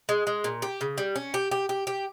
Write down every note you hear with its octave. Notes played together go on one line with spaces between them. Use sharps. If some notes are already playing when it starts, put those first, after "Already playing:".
G#3
G#3
A#2
G4
C#3
G3
C#4
G4
G4
G4
G4